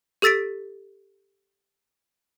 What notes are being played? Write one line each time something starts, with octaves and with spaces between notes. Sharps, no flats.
G4 A4 E6 A6 B6 D7